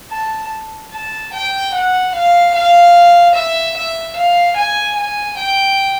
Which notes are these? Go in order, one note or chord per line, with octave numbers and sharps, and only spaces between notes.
A5
A5
G5
F#5
F5
F5
E5
E5
F5
G#5
G#5
G5